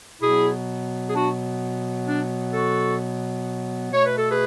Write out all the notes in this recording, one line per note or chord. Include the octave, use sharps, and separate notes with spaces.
B2 F#3 B3 E4 G#4
G#4
D4 F#4
D4
F#4 A4
B2 A3 C#5
B4
A4
G#4 B4